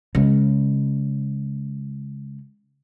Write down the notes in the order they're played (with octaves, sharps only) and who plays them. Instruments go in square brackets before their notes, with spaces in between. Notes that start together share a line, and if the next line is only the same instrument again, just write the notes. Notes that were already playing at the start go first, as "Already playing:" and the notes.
[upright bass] C#3 G#3